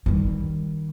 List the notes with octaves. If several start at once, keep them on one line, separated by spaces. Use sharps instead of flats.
D#3 G3